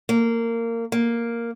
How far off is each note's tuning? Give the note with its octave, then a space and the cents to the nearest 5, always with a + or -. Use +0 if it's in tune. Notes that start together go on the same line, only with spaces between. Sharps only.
A#3 -20
A#3 +0